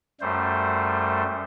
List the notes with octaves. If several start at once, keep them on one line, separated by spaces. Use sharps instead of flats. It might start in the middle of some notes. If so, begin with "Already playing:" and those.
F#2 G3 A3 C5